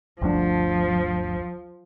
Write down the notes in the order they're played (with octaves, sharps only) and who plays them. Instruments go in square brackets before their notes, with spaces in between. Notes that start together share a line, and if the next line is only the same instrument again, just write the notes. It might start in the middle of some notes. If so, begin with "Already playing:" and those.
[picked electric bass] G1 D2 D4 [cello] F3